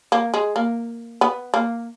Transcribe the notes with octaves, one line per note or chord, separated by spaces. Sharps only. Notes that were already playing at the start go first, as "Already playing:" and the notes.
A#3
G#3
A#3
B3
A#3